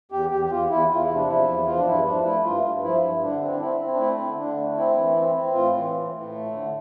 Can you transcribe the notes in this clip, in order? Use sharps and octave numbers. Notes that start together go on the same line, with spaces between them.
E2 G4
E2 G4
G4
E2 F4
E2 E4
E2 F4
E4
C3
D4
F3 E4
E2
F3 F4
D4
G2 E4
F3 D4
A3 E4
G2 F4
G2
F3 E4
G2
D3 D4
C4
D4
C4 E4
C4
D4
A3 E4
D3
D3 D4
A3
C4 E4
E3
C4
C4
A2 F4
E3
A2
A2
A3
D3